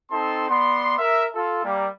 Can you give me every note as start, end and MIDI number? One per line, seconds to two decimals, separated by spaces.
0.11 0.48 60
0.11 0.48 63
0.11 0.48 69
0.11 0.48 81
0.11 0.48 84
0.49 0.94 59
0.49 0.94 74
0.49 0.94 84
0.98 1.26 70
0.98 1.26 76
1.34 1.60 65
1.34 1.60 69
1.63 1.86 55
1.63 1.86 58